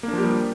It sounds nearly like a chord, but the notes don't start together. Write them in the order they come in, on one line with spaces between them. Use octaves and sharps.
A#3 D4 F3 G4 G3